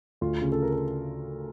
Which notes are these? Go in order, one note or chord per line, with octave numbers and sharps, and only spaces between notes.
D2 F4
C#3
A4
A#4
A4